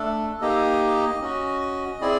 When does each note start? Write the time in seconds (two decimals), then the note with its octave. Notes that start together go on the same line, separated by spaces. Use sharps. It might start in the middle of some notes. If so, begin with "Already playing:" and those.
Already playing: A3 D4 A4
0.41 A#3 D#4 G4 D#5
1.21 C#4 F#4
2.01 C4 E4 G#4 D5